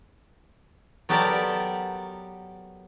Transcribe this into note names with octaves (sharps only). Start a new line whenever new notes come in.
F#3 B3 G4 A4 A#4 D5